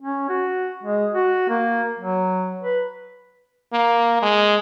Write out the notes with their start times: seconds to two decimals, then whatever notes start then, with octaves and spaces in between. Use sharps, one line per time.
0.02 C#4
0.29 F#4
0.84 G#3
1.14 F#4
1.49 A#3
1.99 F#3
2.63 B4
3.73 A#3
4.22 G#3